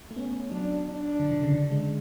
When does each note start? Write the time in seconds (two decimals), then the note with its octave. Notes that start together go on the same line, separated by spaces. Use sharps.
0.11 A3
0.16 B3 C#4
0.50 F#3 D4
0.86 D4
1.20 D3
1.31 D3
1.43 C#3
1.55 D3
1.71 G#3